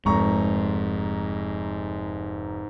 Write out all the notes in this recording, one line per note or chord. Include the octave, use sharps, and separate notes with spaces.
F1 G#2 A#5 C#6